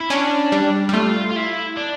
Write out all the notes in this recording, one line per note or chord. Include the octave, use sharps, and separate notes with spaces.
E4
C#4 D4
G3
G3
A3 F4
F4
E4
D4